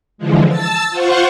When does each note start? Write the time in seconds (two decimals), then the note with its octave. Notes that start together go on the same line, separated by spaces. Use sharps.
0.18 D3 E3 F3 G#3
0.48 A5 E6 A6
0.90 F4 C5 F#5 C#6